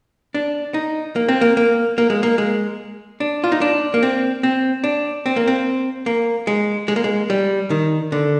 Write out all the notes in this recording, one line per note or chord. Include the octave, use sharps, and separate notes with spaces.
D4
D#4
A#3
C4
A#3
A#3
A#3
G#3
A#3
G#3
D4
F4
D#4
D4
A#3
C4
C4
D4
C4
A#3
C4
A#3
G#3
G#3
A#3
G#3
G3
D#3
D3